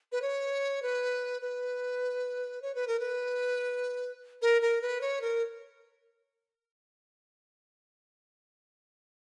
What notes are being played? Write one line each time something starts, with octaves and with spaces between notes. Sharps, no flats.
B4
C#5
B4
B4
C#5
B4
A#4
B4
A#4
A#4
B4
C#5
A#4